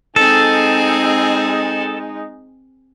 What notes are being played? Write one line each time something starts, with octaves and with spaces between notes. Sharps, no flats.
G#3 C4 D#4 G#4 A4